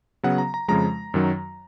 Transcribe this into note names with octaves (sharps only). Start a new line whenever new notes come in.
C#3 F#3 B3 F#5
A#5
A#5
F2 C#3 F3 G#3 A#5
F#2 D#3 F#3